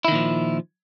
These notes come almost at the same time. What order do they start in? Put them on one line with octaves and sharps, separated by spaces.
E4 D#3 A#2 F3